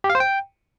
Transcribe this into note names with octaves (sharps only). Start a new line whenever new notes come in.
G4
F5
C5
G5